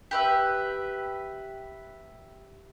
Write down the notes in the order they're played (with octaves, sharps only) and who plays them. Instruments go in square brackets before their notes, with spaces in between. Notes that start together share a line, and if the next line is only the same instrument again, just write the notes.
[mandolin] G4 B4 E5